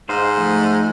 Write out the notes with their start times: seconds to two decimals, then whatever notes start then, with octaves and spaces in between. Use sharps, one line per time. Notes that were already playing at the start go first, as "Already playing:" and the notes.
0.09 G#2 C5 D#5 F5
0.37 F3 A3